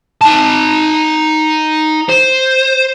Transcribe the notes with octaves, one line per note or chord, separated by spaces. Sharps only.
D#4 A5
C5